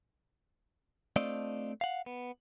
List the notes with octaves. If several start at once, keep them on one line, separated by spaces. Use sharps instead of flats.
A3 C4 D4 F4 D5 D#5
F5 F#5
B3